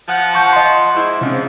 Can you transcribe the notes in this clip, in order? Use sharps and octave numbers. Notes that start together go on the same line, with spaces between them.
F3 F#5
A5 C#6 G6
D#5 C6
G#2 E4
G#2 C3 F3 C#4